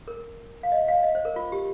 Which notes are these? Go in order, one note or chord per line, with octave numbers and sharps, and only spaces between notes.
A#4
F5
D#5
F5
D#5
C5
A#4
F4
G4